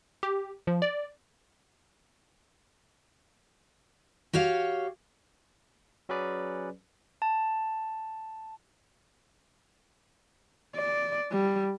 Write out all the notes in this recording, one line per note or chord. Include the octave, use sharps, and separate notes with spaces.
G4
F3
D5
F#4 G4 C#5 F5
F#3 C#4 G#4 B4 D5
A5
D5
G3